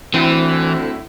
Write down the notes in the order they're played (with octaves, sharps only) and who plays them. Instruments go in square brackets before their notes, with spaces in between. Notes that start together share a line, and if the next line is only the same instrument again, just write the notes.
[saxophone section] D2 A2 E4 [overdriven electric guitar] E3 [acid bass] C4